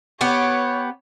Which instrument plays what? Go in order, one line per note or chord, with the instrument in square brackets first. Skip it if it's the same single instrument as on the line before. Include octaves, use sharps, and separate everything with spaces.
[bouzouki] B3 G4 [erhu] C#5